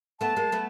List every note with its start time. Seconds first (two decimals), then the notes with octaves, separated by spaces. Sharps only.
0.20 A3 B3 A5
0.36 G#3 A#3
0.52 A3 B3